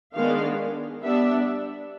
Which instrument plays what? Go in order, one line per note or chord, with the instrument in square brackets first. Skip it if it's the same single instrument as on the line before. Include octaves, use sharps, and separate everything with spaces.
[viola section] D#3 G#3 B3 D4 F5
G3 B3 D4 E5